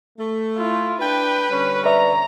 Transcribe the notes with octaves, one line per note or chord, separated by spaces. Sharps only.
A3
E4 F4
D4 B4 G5
D3 G3 C#4
B4 D5 E5 A#5